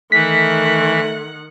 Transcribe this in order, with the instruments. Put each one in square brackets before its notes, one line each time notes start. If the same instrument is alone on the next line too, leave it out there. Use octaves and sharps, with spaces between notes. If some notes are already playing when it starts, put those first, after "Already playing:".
[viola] D#3 F#5 [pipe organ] E3 [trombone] A3 [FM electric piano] B6